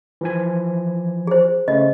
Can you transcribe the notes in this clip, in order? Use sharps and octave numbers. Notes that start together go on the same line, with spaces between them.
E3 F3 G#5
G#4 C5
C#3 A3 C#4 D#5